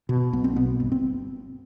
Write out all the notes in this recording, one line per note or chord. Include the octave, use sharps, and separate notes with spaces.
B2
B1 B3
C4
B2 B3
G1
C4